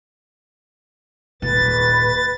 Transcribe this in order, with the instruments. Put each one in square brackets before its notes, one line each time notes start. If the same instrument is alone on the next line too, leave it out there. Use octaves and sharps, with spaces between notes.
[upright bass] D#1 A#2 [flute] B4 [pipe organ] A6